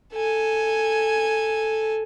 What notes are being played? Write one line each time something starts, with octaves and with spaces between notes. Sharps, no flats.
A4 G#5